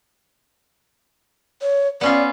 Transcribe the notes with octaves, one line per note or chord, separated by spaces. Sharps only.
C#5
B3 C#4 F4 D5